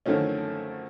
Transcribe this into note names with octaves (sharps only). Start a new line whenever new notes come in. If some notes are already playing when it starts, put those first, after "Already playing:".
F#2 D3 D#3 F3 A3 C#4